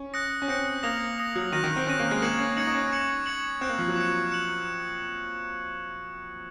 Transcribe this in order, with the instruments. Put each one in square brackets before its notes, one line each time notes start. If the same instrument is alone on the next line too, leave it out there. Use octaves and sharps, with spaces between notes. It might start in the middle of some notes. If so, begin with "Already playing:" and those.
Already playing: [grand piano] C#4
[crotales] D#6 F#6 A#6 C#7
[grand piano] C#4
[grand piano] C4 [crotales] D#6 F#6 A#6 C#7
[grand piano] A#3 [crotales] D#6 A#6 F7
[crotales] D#6 A#6 F7
[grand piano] F#3
[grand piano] D#3 [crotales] F#6 A#6 D#7
[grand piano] D#3
C4
[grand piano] C#4 [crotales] F#6 A#6 D#7
[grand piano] A#3
G#3
[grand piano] A#3 [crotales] C#6 G#6 C#7 F#7
[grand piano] C#4
[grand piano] D#4 [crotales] C#6 G#6 C#7 F#7
[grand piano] D#4
C#4
[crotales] C#6 G#6 C#7 F#7
C#6 G#6 C#7 F#7
[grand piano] C4 [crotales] C#6 F#6 C#7
[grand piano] A#3
F3
F#3
[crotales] C#6 F#6 C#7
F#6 C#7 F#7